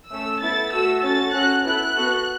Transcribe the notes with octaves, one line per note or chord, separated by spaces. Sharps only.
A3 C#4 A4 E6
B3 E4 A4 A6
A3 F#4 A4 E6
C#4 F#4 A4 A6
C#4 F#4 A4 F#6
B3 E4 A4 F#6
B3 F#4 A4